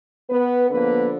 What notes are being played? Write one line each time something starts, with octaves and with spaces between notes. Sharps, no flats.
B3 B4
D3 F3 A#3 B3 B4